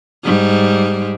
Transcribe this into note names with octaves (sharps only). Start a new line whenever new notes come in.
G#2 G3